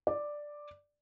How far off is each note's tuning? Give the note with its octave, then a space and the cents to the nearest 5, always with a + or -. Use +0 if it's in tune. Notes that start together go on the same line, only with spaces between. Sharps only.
D5 +5